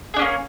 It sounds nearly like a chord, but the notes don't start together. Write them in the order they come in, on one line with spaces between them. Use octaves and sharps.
G#4 D4 C#4 A#3